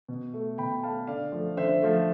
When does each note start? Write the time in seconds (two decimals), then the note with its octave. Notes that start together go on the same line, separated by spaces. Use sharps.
0.09 B2
0.34 A3
0.58 B2 G5 B5
0.83 A3 F5 A5
1.07 D3 D5 F5
1.32 F3 A3
1.57 D3 C5 E5
1.82 F3 A3